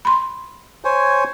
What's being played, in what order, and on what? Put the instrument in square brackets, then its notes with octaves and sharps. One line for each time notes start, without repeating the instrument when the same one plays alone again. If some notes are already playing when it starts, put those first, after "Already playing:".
[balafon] B5 C6
[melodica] C5 C#5 G#5